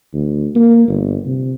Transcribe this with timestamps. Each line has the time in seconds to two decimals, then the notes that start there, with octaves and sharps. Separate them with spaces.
0.14 D2
0.55 A#3
0.88 G1
1.26 C3